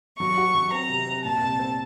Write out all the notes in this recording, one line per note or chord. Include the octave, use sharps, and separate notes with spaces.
F#3 C#6
F#4
F#3
C4 A#5
C3
C4
A#2 A5
C2
C4